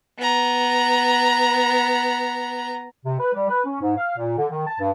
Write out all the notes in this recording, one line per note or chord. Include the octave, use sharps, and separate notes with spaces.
B3 A#5
C3
B4
G3
B4
C#4
G#2
F5
A#2
D3
D#3
A5
G2